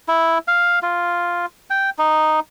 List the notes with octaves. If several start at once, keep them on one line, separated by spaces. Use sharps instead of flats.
E4
F5
F4
G5
D#4